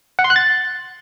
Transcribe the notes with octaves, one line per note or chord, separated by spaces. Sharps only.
F#5
C6
F#6
A6